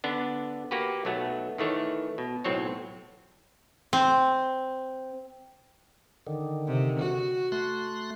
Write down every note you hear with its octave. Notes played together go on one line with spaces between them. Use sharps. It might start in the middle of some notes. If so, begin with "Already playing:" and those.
D3 B3 D4
A#3 F#4 G4 B4
B1 F#3 A3 B3
D#3 E3 A3 C#5
B2
B1 A2 F#3 C4 C#5
C4
D3 D#3
C3
F#4
A3 C6 F#6